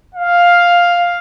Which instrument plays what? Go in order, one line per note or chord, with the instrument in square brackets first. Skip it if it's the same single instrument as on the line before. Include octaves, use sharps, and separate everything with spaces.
[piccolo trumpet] F5